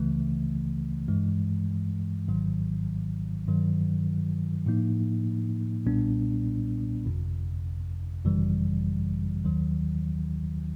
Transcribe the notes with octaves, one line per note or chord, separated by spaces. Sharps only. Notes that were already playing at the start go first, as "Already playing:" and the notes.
Already playing: C#2 C#3 E3 A3
G2 E3 G#3
G#1 G#2 D#3 F#3
G2 D#3 F#3
A2 F3 A#3 D#4
B1 A#2 G3 B3 D4
G1 F2 C3
G#1 F#2 C#3 E3 G3
D#2 D#3 F#3